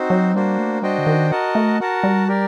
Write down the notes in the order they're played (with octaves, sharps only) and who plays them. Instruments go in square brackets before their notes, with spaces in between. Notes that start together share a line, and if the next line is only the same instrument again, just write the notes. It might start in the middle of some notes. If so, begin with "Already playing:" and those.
Already playing: [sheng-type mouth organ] C4 D#4 F#4 C5
[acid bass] F#3
[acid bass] G3 [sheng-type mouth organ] A#3 D4 F#4 C5
[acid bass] A3
[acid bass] G3 [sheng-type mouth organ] D4 F#4 C5 D#5 G5
[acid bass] D3
D#3
[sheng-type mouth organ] F#4 A#4 D#5 F#5 A5
[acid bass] A3
[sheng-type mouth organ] F#4 A#4 F#5 A5
[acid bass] G3
[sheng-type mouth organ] G4 A#4 D5